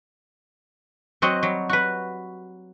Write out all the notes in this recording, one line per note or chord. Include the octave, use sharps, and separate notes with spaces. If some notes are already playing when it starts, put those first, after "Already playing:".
F#3 C4 F#4 D#5
F#3 G3
F#4 B4